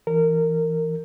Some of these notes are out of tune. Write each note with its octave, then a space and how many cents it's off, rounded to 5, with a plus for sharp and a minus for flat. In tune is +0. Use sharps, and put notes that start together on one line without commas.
E3 +5 A#4 -20